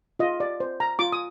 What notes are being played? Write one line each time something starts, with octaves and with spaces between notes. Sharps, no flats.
F4 D#5
D5
C5
A#5
F4 D6
D#6